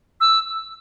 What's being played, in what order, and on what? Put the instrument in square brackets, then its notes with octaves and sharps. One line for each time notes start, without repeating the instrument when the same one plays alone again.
[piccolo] E6